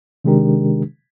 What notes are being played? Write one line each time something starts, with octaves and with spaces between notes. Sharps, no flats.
C3 D#3 G#3 D4 G4 A#4